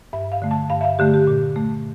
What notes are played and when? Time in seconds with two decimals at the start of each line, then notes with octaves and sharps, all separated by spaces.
0.13 G2 E5
0.32 F5
0.42 D3 A3
0.51 A5
0.70 G2 F5
0.81 E5
0.84 F5
0.99 D3 A3 G4
1.14 G4
1.27 A#2
1.56 A3